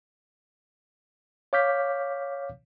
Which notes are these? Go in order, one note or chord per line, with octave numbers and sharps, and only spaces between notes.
C#5 F5 D6 F6 G6 B6